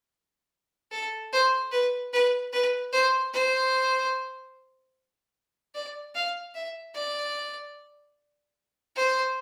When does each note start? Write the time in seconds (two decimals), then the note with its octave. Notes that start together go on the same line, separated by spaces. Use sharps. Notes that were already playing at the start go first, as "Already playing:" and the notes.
0.92 A4
1.33 C5
1.72 B4
2.13 B4
2.53 B4
2.92 C5
3.33 C5
5.75 D5
6.15 F5
6.55 E5
6.94 D5
8.96 C5